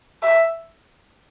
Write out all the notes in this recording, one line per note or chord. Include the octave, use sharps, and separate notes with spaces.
E5